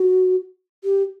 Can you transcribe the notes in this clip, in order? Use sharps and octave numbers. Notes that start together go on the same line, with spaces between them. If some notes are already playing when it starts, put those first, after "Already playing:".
Already playing: F#4
G4